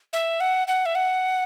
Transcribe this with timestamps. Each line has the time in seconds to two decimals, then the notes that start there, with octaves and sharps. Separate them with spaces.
0.13 E5
0.40 F#5
0.68 F#5
0.86 E5
0.95 F#5